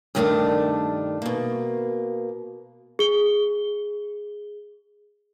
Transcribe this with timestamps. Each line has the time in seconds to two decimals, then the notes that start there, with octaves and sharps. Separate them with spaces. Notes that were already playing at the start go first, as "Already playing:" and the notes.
0.15 G2 C3 D#3 A3 C4 D4
1.22 B2 A#3
2.99 G#4 G7